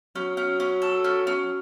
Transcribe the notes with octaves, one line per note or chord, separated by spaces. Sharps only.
F#3 C#4
C#4
C#4
A4
C#4
C#4